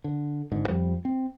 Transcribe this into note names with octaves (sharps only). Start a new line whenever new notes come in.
D3
G#1 G#2 D3
F2 F3 G3
C4